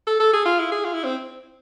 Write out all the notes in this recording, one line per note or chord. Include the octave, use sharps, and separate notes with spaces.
A4
A4
G#4
F4
E4
G#4
F4
E4
C4